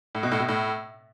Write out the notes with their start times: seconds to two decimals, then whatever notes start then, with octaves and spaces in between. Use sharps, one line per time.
0.15 A2
0.23 B2
0.32 A2
0.40 B2
0.48 A2